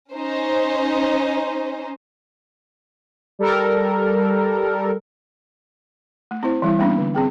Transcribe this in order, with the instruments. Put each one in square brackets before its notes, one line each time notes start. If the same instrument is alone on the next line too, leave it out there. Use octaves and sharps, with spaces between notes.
[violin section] C#4 D#4 C5
[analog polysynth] G3 A4 A#4
[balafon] A3
C4 E4 C5
E3 G3 E4
G3 A#3 B3 C#4 D4
D3
C4 G#4 G5